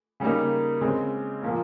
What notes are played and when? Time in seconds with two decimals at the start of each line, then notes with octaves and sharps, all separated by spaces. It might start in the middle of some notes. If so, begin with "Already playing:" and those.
0.20 C#3 G3 A#3 D#4
0.81 C#3 G#3 C4
1.42 A#2 F3 A#3